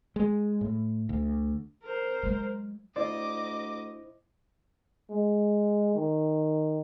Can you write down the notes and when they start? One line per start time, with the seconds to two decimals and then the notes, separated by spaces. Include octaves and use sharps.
0.16 G#3
0.61 A2
1.09 D2
1.83 A#4 C5
2.23 F#3 G#3
2.96 D2 E4 C5 D5 D#5 D6
5.10 G#3
5.95 D#3